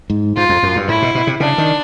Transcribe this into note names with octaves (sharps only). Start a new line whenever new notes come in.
G#2
G#2 F4
F2
F#2
G2
A2 E4
B2
B2
C3
C#3 D4
D#3